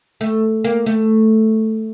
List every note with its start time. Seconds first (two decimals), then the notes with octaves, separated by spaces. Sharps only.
0.21 A3
0.64 A#3
0.86 A3